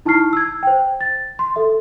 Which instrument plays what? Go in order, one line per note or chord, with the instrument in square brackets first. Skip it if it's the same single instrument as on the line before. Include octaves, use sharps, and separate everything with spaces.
[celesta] D#4 E4 A5 C#6 F6 C7
E6 G#6
C5 G5
A6
C6
A4 E5